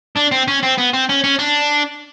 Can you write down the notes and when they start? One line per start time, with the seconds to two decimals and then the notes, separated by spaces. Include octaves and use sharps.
0.17 D4
0.32 C4
0.48 C#4
0.63 C4
0.78 B3
0.93 C4
1.09 C#4
1.24 C#4
1.39 D4